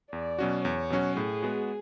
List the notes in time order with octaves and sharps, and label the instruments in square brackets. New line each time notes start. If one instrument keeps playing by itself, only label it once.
[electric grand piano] E2 [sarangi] D5
[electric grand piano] B2 F#3 C#4 F#4
[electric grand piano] E2 [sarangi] C#5
[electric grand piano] B2 F#3 C#4 F#4
[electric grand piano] A2 [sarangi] G#4
[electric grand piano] G#3 B3 F#4